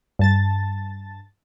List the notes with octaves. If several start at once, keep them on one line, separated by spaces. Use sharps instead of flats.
G2 A5 A6